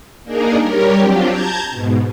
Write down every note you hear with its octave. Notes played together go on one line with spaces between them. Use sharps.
A#3 D4 D#4 G#4 A#4
G3 G4 A#4 C#5
F#3 C4 D4 F4 G4
A5 A#5 G6 G#6
G#2 B2